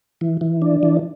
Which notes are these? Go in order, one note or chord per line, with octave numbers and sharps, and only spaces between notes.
E3
E3
D4
E3